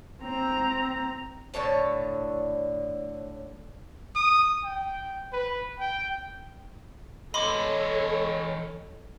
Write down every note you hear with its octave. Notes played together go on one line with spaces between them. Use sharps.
C4 A#5
A2 D3 C#5 A5
D#6
G5
B4
G5
E3 A4 C#5 D#5 B5 C6 D6